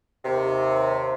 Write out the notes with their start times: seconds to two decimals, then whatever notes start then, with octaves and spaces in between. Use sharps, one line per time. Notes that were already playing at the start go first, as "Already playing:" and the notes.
0.25 D#2 C3